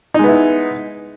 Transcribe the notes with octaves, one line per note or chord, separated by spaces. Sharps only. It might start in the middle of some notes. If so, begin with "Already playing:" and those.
G#3 B3 D#4 E4